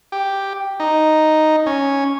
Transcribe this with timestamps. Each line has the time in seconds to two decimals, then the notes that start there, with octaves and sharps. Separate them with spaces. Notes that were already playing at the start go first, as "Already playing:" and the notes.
0.12 G4
0.80 D#4
1.66 C#4